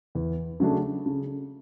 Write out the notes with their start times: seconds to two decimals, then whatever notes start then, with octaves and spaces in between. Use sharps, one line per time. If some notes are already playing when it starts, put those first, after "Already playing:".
0.15 E2
0.60 C#3 F#3 A3 D4
1.06 C#3